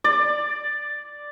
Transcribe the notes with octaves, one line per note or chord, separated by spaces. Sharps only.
D5